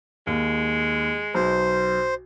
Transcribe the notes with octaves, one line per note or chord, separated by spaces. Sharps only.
D#2 G#3
B1 C5